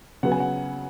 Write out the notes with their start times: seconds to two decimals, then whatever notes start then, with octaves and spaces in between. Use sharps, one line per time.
0.23 C#3 F#3 B3 F#5
0.32 G#5
0.40 F#5